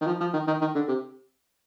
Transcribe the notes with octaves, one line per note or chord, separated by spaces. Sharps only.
D#3
F3
F3
D#3
D#3
D#3
D3
C3